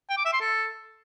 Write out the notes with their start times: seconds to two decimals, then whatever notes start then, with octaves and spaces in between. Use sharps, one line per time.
0.10 G5
0.17 D6
0.25 E5
0.33 C6
0.41 A4